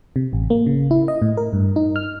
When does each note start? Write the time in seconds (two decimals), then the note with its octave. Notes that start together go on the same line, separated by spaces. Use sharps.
0.16 C3
0.33 A1
0.50 A#3
0.66 C#3
0.91 E4
1.08 D#5
1.22 A2
1.37 A#4
1.53 G2
1.76 D#4
1.96 F6